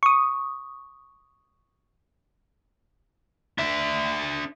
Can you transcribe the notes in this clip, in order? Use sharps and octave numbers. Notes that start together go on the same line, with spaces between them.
C#6 D#6
D4 E5